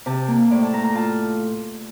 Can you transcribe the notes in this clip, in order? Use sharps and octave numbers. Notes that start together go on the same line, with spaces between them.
C3 A5
A#3
A2 D5
A5
A3 A#5
A#5
F4 A5